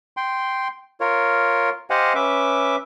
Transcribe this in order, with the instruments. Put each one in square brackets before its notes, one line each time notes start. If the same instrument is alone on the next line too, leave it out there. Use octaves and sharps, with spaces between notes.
[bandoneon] G5 C6
F4 A#4 C#5
G4 C5 D#5 F5 F#5 G#5
C#4 B4 E5 D6